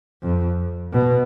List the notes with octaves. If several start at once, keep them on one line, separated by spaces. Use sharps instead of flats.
F2
B2